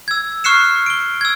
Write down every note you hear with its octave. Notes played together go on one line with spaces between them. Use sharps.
E6 G#6
C#6 F6 F#6 C7 C#7 E7
D7 G7
E6 G#6